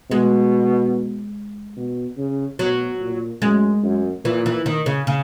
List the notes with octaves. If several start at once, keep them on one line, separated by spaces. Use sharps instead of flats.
B2 G#3
B2
C#3
B2 F#3
A#2
F#2 G#3
F#2
A#2 E3
E3
D#3
C#3
C#3